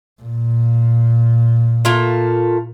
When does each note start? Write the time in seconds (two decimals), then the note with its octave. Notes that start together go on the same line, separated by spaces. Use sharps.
0.22 A#2
1.85 A3 A#3 F4